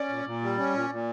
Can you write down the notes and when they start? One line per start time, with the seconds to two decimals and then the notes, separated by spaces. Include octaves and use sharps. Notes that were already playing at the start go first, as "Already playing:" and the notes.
Already playing: C#4 D5
0.09 A#2
0.25 A#2
0.42 G3
0.58 C#4
0.74 A#2
0.90 A#2